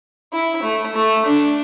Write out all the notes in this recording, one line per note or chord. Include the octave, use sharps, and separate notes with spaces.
E4
A3
A3
D4